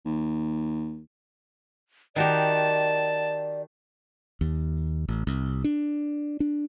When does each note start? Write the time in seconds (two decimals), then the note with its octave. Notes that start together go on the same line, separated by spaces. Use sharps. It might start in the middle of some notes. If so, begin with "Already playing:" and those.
0.06 D#2
2.16 D#3 F#4 G4 D5 A5
4.41 D#2
5.09 A1
5.27 C2
5.64 D4
6.40 D4